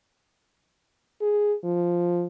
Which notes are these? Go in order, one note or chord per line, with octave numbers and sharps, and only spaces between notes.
G#4
F3